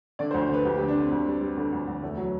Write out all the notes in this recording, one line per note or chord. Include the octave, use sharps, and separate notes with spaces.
D3 D5
C5
D2
C5
D3 B4
D2 G4
D2 G4
D4
D3 C4
D2
G3
G3
D3
D2
D2
E2 A3
F#3